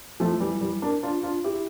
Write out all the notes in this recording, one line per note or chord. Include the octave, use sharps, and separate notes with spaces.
F3 A3
E3 G3
E3 G3
A#3 D4
D4 F4
D4 F4
E4 G4